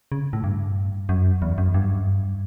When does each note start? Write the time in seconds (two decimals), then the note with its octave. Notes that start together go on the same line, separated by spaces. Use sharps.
0.12 C#3
0.33 A2
0.44 G2
1.09 F#2
1.42 E2
1.58 F#2
1.74 G2